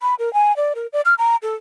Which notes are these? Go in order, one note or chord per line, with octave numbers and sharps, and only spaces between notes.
B5
A#4
G#5
D5
A#4
D5
F6
A#5
A4